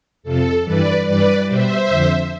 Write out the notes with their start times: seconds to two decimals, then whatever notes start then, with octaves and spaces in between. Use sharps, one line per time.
0.23 F2 C3 F3 A4
0.64 G2 E3 G3 B4 D5
1.05 G2 E3 G3 B4 D5
1.46 B2 G3 C5 E5
1.88 F2 D3 F3